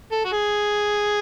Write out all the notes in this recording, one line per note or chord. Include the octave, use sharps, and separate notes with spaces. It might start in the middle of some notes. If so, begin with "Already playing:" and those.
A4
F#4
G#4